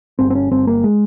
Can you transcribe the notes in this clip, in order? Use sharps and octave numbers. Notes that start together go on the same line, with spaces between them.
G1 C4
C4
C#4
G1 C4
A#3
G#3